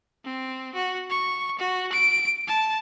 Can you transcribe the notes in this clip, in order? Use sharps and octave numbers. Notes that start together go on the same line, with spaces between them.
C4
F#4
C#6
F#4
D7
A5